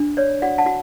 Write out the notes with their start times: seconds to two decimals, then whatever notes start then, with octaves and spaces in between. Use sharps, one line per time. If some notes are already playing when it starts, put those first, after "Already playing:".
Already playing: D4
0.17 C#5 D5
0.42 F#4 D5 F#5
0.58 F#5 A5
0.66 F#4